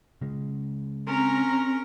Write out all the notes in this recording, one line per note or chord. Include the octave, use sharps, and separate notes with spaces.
C#3 G#3
C4 C#4 A#4 A#5